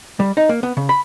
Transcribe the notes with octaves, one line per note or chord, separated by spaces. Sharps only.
G3
D#4
A#3
B3
C#3
B5